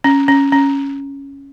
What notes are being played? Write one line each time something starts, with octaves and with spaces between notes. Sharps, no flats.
C#4
C#4
C#4